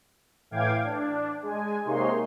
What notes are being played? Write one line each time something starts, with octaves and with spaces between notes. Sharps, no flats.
A2 E3 F5 G5 D6 G#6
D4
G#3 G#5
C3 G#3 A#3 D#4 C#5 C6